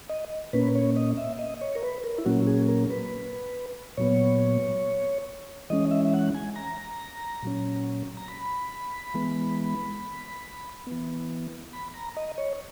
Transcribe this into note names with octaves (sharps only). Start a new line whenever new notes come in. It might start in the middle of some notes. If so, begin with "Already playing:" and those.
D#5
A#2 A#3 C#4 B4
C#5
D#5
E5
D#5
C#5
A#4
B4
A#4
E4
A#2 F#3 A#3 C#4 F#4
G#4
A#4
B4
A#2 F#3 B3 C#5
E3 G#3 C#4 D#5
E5
E5
F#5
G#5
A#5
A#2 F#3 C#4
A#5
B5
E3 G#3 B3
E3 B3
B5
A#5
D#5
C#5